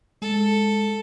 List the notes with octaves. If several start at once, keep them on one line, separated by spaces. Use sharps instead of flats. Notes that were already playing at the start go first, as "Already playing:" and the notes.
G#3 A4